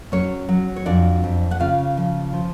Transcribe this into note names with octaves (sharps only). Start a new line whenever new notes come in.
F#3 C#4 C#5
F#3
C#5
F2 D4 D5
F2
F#5
C#3 F4 F5
F3
F3